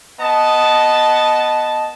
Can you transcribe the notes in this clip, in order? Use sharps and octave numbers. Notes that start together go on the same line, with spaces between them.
B3 D#5 A5